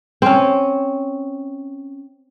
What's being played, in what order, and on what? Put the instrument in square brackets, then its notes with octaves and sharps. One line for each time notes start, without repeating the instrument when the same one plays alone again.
[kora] C4 C#4